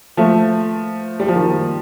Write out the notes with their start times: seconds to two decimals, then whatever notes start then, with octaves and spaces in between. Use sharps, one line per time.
0.17 F3 A3
1.20 G3
1.28 F3
1.36 D#3 G3